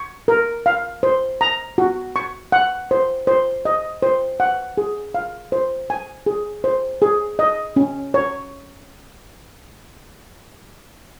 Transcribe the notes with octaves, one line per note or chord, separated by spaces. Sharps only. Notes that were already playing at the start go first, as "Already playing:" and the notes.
Already playing: C#6
A#4
F5
C5
A#5
F#4
C#6
F#5
C5
C5
D#5
C5
F#5
G#4
F5
C5
G#5
G#4
C5
G#4
D#5
C#4
C#5